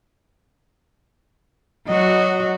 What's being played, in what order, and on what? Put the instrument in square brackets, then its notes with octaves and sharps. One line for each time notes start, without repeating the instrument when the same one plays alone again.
[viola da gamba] F#3 F#4 [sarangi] D#5